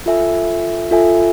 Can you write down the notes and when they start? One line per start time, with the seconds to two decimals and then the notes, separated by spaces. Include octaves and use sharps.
0.06 F4 A4 E5 G#5
0.91 F4 A4 E5 G#5